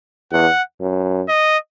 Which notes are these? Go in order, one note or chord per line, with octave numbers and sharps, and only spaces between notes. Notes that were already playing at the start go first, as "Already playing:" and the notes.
E2 F#5
F#2
D#5